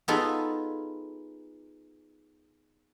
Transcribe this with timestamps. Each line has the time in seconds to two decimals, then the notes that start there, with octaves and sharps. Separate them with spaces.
0.08 B3 D#4 F4 G#4 A4 B4